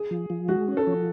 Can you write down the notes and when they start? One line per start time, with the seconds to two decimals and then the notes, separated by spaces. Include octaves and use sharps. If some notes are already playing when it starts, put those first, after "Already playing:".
Already playing: G#4
0.11 F3
0.30 F3
0.48 G#3 F#4
0.68 C#4
0.77 A4
0.87 F3